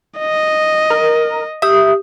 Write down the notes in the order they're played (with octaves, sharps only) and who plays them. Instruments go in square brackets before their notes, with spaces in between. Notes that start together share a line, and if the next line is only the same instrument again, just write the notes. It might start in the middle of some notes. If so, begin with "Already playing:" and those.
[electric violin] D#5
[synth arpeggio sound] A#4
[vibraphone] G4 D#6 [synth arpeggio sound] E5